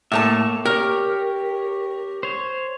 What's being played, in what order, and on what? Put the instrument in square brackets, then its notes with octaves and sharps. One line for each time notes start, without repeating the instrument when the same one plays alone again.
[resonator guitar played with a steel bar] A2 A3 A5 [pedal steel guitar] A#3 C#5 E5
[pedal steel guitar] G4 C#5 [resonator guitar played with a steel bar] A#4
[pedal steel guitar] C5 C#5